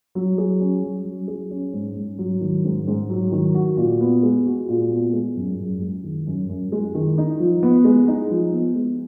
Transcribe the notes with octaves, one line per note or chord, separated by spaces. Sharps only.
F#3
G#4
C#4
F#3
F#3
G#4
C#4
G#2
G#2
F#3
D#3
G#2
G#2
F#3
D#3
F#4
A#2
B3
G#3
F#4
A#2
B3
G#3
F#2
F#2
G#3
D#3
F#2
F#2
G#3
D#3
D#4
F3
B3
G#3
D#4
F3
B3
G#3